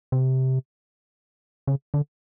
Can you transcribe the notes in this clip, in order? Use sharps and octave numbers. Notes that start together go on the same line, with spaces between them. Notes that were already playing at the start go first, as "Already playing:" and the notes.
C3
C#3
D3